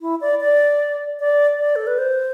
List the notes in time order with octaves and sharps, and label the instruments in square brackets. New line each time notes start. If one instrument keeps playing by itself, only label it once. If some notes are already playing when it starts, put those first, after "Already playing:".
[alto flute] E4
D5
D5
D5
D5
A4
B4
C5